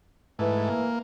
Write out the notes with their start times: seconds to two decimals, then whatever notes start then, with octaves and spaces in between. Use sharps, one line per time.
0.39 G#2 E3 A3
0.70 A#3